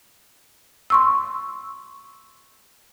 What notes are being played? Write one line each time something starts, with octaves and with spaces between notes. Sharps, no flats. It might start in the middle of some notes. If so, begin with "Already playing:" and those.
C6 C#6 E6